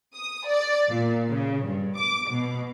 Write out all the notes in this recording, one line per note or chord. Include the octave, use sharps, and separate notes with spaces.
D#6
D5
A#2
C#3
G2
D6
B2